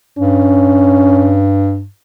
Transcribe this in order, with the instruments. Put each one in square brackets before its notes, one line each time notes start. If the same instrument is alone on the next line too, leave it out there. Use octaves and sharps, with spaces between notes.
[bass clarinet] G2 [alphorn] C#4